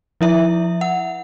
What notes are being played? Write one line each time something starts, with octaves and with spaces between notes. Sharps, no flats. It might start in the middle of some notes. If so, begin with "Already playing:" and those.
F3 E4 E5
F#5